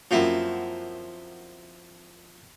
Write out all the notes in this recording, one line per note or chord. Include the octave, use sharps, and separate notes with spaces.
F#2 F3 A#3 C4 E4 F#4